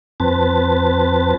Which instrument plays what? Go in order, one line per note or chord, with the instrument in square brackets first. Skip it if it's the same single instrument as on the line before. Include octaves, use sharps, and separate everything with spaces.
[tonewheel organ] F2 C4 B4 A5